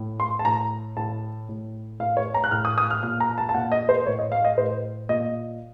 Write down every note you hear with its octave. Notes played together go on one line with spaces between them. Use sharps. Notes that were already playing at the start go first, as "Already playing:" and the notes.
Already playing: A2
C6
A5
A2 A#5
A2 A5
A2
A2 F5
C#5
A#5
F#6
A2 F6
D#6
D#6
F6
A#2 F6
A#5
A5
A5
A#2 F#5
D#5
C5
A2 C#5
D#5
F5
D#5
A2 C5
A#2 D#5